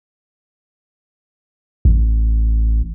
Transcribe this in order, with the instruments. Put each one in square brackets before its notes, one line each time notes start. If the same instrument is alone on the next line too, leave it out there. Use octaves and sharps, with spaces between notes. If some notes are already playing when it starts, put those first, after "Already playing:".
[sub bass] A1